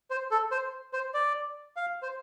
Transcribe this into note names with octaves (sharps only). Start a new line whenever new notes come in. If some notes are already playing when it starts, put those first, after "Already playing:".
C5
A4
C5
C5
D5
F5
C5